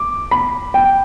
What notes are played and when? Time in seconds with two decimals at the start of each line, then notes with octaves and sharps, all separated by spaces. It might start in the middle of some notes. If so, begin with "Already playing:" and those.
Already playing: D6
0.31 B5
0.74 G5